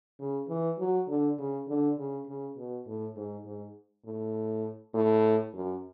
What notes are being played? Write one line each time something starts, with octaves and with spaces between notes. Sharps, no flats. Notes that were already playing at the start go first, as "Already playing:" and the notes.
C#3
E3
F#3
D3
C#3
D3
C#3
C#3
B2
A2
G#2
G#2
A2
A2
F#2